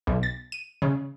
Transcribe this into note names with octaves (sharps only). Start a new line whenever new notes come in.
B1
A6
D#7
C#3